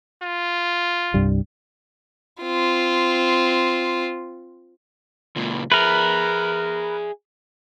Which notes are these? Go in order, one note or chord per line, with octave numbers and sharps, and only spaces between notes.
F4
C2 G2 G3
C4 F4
C#2 A#2
G#4 A#4 B4 E5